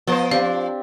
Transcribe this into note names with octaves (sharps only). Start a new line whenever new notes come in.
F3 B3 C5 D#5 A5
C4 D4 G4 F5